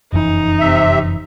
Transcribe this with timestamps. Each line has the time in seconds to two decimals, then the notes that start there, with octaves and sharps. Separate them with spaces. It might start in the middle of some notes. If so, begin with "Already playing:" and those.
0.13 F1 F#2 E3 D#4
0.60 C3 E5